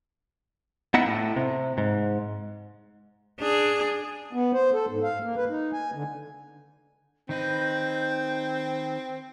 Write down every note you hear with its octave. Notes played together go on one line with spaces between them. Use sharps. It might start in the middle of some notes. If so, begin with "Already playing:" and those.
B3 D#4 E4 D#5 F#5
A2
C3
G#2
D4 G#4
B3
C5
A4
G#2
F5
A#3
B4
D#4
G#5
D3
D#3 C4 D#4 B4 G6